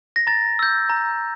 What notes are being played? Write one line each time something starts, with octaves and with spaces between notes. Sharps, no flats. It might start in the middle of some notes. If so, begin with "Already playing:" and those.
A#6
A#5 A6
E6 G6
A#5